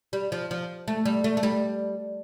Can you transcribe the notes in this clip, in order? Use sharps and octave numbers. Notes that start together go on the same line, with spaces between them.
G3
F3
F3
A3
G3
A3
A3
G3